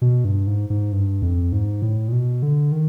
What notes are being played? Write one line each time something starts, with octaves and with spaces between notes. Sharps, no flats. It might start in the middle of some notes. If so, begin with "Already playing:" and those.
B2
G2
G#2
G#2
G2
F2
G#2
A2
A#2
B2
D3
D#3